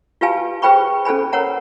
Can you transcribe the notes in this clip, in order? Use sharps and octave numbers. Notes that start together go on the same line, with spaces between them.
F4 G4 B4 F5 G#5 A5
G#4 B4 C5 G5 B5 C#6
C#4 A4 C5 G#5 B5
A#4 B4 C#5 F#5 A#5